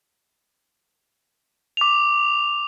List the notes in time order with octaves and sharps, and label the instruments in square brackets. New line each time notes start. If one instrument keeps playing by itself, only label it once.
[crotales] D6 F7